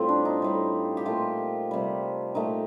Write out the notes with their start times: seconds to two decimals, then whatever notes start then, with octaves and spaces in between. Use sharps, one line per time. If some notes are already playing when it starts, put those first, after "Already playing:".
Already playing: A2 G3 C4 F4 G4
0.09 D4
0.25 D#4
0.42 A2 G3
0.97 G4
1.06 A#2 A3 F4
1.71 C3 G3
2.35 A#2 A3 D#4